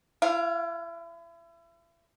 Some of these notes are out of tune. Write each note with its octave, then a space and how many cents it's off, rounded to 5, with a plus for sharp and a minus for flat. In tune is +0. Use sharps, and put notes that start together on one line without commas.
E4 +35 F5 +0